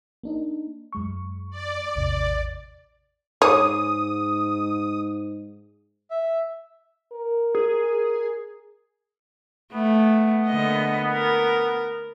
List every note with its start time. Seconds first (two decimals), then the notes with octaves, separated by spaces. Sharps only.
0.23 A#3 D4 D#4
0.93 F#2 G#3 C#6
1.50 D5
1.95 A1 E2 C3
3.42 G#2 G#4 C#5 D6 D#6
6.11 E5
7.13 A#4
7.55 G#4
9.73 A3 B3
10.47 D3 A#3 D#5
11.13 A#4